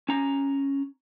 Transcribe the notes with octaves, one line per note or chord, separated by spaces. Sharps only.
C#4 A#5